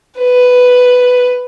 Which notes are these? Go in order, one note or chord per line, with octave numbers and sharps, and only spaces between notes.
B4